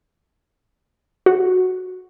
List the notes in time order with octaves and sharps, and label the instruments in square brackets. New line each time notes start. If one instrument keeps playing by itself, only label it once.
[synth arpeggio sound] F#4